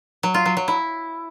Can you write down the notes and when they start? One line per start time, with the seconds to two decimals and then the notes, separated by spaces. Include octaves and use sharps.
0.23 F#3
0.34 F4
0.46 F#3
0.57 F#3
0.68 E4